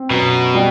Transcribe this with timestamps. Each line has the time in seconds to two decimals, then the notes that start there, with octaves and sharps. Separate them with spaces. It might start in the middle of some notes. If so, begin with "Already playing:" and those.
Already playing: C4
0.10 F#2 B2
0.55 G3